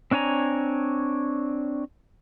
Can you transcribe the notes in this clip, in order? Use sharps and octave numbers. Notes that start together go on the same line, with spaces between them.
C4 D4 C#5 G#5 A#5